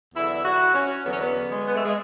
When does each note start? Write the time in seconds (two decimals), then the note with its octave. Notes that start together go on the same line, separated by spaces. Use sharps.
0.14 E2 D3 F#3 E4
0.45 F#4
0.74 C#4
1.04 E2 D3 F#3 B3
1.13 C#4
1.20 B3
1.49 G#3
1.67 B3
1.75 A3
1.85 G#3